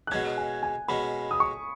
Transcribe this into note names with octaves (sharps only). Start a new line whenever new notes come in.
F#6
B2 G#3 C#4 G#6
G#5
G#5
B2 G#3 C#4 B5
D#6
C#6